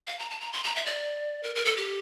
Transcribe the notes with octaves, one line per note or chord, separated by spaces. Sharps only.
F5
A#5
A5
A#5
C6
A#5
E5
D5
A#4
A#4
A4
G4